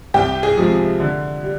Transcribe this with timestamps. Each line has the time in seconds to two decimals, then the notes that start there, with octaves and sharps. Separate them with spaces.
0.14 C2 G4
0.43 G#4
0.57 C3 F3 G#3
1.00 D3
1.43 G3